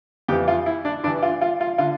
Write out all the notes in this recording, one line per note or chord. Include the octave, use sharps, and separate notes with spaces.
F2 E3 G4
F4
E4
D4
G2 E3 D4
F4
F4
F4
D3 F4